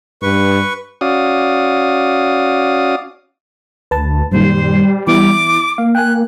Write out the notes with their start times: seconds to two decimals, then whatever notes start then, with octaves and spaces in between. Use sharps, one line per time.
0.22 G2 B4 C#6
1.01 C#4 F#4 D5 F5 D#6
3.91 D2 B4 A5
4.32 F#2 A#2 D#3 G3 C5
5.07 E3 B3 E4 D6
5.78 A#3 F5
5.95 G5 G#5 F#6